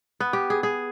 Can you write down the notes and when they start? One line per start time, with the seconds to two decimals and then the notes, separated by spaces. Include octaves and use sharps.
0.20 B3
0.33 G4
0.50 G#4
0.63 G#4